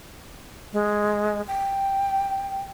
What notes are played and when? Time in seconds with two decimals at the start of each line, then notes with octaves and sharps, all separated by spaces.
0.73 G#3
1.47 G5